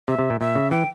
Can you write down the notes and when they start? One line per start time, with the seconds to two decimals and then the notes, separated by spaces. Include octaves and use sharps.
0.08 C3 E5
0.19 C3
0.30 A#2
0.40 A#2 E5
0.55 C#3
0.71 E3 G5